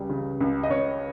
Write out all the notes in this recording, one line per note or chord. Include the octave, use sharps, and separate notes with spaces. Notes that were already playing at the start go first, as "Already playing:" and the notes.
Already playing: C#2 G3
C#3
C#2
D#5
C#2 C#5